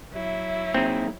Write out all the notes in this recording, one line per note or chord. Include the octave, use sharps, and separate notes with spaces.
F#3 E4 E5
A#3 C4 D#4 G#4